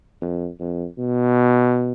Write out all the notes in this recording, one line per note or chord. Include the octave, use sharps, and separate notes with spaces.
F2
F2
B2